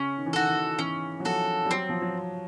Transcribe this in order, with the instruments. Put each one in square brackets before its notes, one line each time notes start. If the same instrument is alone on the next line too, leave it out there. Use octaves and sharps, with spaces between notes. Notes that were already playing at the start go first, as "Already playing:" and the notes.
Already playing: [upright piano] C#3 [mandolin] C#4
[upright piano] D#3
E3
[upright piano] D#3 [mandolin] F#4 A4
[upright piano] E3
[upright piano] E3 [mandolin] C#4
[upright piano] F#3
[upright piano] F3 [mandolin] F#4 A4
[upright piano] G3
[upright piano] F#3 [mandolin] C4
[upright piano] F3
F#3